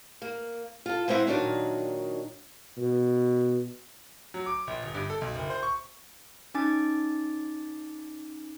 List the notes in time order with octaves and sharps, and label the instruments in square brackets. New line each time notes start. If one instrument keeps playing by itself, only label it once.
[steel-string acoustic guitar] A#3
F4 A4
G#3 C4 E4 C5 E5 F#5
A#2 D#3 F#3 D4 D#4
[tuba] B2
[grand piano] F#3
D6
A#1
G1
G2
A4
B1
F#1
C5
C#6
[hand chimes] C#4 D#4 G#5 D6 A6